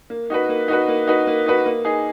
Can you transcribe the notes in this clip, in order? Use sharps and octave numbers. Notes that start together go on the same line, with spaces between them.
A#3
D#4 F#4 B4
A#3
D#4 F#4 B4
A#3
D#4 F#4 B4
A#3
D#4 F#4 B4
A#3
D#4 G#4